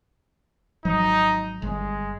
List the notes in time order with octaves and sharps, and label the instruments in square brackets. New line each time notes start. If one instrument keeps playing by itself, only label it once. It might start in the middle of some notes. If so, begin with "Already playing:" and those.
[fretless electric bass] G#1 F3 F#3 [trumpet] D#4
[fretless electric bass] G1 [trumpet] G#3